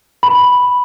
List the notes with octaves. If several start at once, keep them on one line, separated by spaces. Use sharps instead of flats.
B5